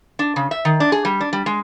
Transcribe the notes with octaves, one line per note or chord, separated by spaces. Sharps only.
D4
C#3
E5
D#3
D4
G#4
G3
D4
G3
G#3